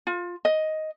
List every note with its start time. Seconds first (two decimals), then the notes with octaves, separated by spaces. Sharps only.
0.07 F4
0.45 D#5